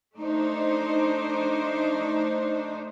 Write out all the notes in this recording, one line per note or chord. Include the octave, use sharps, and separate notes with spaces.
A3 D4 D#4 C5